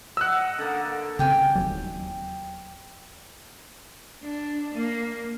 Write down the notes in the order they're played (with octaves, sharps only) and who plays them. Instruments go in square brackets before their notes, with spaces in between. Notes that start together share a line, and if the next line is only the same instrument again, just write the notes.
[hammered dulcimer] D#5 F#5 [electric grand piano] E6 F#6
[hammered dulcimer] D3 A#3
[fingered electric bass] C#3 C4 [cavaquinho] G4 G5 G#5
[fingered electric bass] E1 D#2 F#3
[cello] D4
A#3